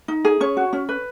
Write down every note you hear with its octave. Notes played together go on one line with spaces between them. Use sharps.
D#4
G#4
C#4 C#5
F#4
C#4
B4